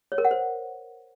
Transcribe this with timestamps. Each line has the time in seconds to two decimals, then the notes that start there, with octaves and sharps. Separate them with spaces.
0.12 C#5
0.18 A#4
0.25 F#5
0.31 C5